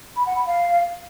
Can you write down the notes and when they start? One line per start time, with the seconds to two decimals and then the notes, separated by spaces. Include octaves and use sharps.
0.16 B5
0.26 F#5
0.36 B5
0.46 F5